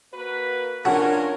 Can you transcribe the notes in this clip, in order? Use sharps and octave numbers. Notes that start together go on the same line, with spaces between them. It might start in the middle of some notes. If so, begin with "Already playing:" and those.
A#3 F#4 B4
C#4 D4 F4 F#4 G#4 A#4 C#5